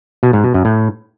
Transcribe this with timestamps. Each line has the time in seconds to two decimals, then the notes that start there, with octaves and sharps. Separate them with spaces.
0.23 B2
0.33 G#2
0.44 B2
0.54 F#2
0.65 A2